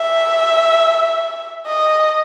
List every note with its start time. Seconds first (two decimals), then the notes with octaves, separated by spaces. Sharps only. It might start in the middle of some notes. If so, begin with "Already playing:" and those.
Already playing: E5
1.66 D#5